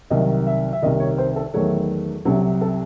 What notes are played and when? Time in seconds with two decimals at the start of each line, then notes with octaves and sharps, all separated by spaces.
0.10 C2 C3 D#3 F#3 D#5
0.47 E5
0.73 E5
0.82 C2 C3 D#3 D#5
1.00 C#5
1.18 C5
1.36 A4
1.54 E2 D#3 F#3 A3 C#5
2.25 C2 C3 F#3 A4
2.61 A4